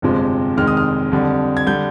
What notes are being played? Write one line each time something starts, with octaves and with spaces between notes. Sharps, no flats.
G1 F2 C3 F3 G#3
F1 F2 D#3 G#3 F6
D#6
F6
F2 D3 G3
G#6
D3 G3 G6